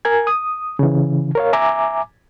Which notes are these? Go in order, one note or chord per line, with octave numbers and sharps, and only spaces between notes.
A#4 G#5 G#6
D#6
C#3 E3
A#4 C#5 F5
E5 G#5 A#5 D6